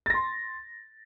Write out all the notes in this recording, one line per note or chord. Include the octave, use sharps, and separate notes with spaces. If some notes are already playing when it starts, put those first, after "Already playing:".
C6 A6 A#6